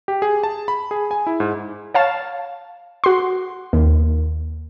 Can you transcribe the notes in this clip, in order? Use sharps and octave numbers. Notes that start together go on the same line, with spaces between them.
G4
G#4
A5
B5
G#4
G#5
E4
G#2
C#5 F5 A5
F#4 C6
D#2